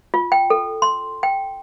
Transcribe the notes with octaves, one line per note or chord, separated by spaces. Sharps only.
F4
G5
A4
C6
G5